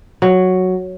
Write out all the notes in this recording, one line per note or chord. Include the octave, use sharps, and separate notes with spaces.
F#3